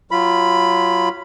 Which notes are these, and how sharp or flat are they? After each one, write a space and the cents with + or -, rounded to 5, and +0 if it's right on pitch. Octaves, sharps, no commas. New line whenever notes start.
F#3 +0 F4 -20 B5 +0